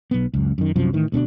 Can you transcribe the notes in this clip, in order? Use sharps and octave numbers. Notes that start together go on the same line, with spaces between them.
B1 B3
C#2 F#2
F#2 D#3
C2 F#2 C3 F3
A2 D#3 E3
D2 B2 B3 D4